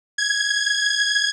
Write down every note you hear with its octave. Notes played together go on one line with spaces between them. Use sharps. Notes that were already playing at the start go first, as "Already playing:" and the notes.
G#6